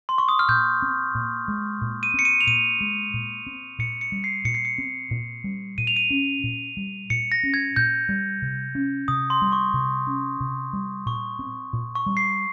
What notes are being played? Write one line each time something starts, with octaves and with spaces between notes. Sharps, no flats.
C6
C#6
D#6
F6
A#2 G6
C4
A#2
G#3
A#2
D#7
C4 C#7
D#7
F7
A#2 D#7
G#3
A#2
C4
A#2 C#7
C#7
G3
C7
A#2 C#7
C7
C#7
C4
A#2
G3
A#2 D#7
F7
D#7
C#4
A#2
G3
A#2 C#7
A#6
C#4
G#6
A#2 G6
G3
C3
C#4
C3 D#6
C6
G3
C#6
C3
C#4
C3
G3
A#2 C#6
C4
A#2
C#6
G3
C7